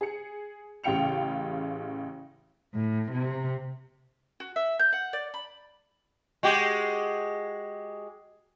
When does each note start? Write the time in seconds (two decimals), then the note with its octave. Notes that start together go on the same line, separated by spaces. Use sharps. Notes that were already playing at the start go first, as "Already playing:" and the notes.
0.01 G#4 C#7
0.84 A1 C#3 F5 G5 C#7 F7
2.74 A2
3.12 C3
4.40 F#4
4.56 E5
4.79 G6
4.93 F#5
5.13 D5
5.34 B5
6.43 G#3 F#4 G4